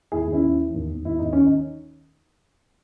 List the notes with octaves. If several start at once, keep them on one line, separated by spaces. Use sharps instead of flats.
D#2 E4 G#4
D#2
C#4 E4
D#2
E3
D#2
D#2
D#2 E4
D#2 D#4
D#3 C#4
D#4
D#3